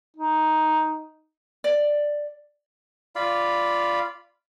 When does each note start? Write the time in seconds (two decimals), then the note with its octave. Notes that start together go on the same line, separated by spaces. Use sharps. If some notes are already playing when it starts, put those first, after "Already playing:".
0.17 D#4
1.64 D5
3.16 F4 D5 F5 B5